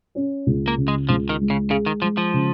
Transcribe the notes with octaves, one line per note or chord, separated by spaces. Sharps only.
C#4
C#2
A#3
C#3
G#3
C#2 F3
D#3
G#3
C#3
C#3 G#4
D#3
F3 G#3
F3
C#3